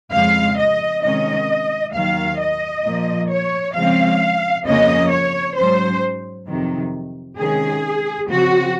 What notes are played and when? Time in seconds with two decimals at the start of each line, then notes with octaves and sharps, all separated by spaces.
0.12 F2 C#3 G#3 F5
0.59 D#5
1.03 C3 D#3 G#3 C#4 D#5
1.94 D#2 D#3 F#3 F5
2.40 D#5
2.85 A#2 F3 A#3
3.30 C#5
3.75 C#3 F3 G#3 C4 F5
4.66 F2 C#3 F3 A#3 C#4 D#5
5.11 C#5
5.57 G#2 F#3 C#4 C5
6.47 F2 C3 D#3 F#3
7.38 C3 D#3 G#3 C#4 G#4
8.29 C#3 F3 C4 F#4